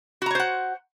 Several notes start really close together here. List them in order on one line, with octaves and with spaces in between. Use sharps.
F#4 A#5 C#5 C5 F#5